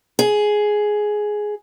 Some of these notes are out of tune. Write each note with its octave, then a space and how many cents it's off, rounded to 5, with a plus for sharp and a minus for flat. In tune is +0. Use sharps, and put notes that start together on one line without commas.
G#4 +10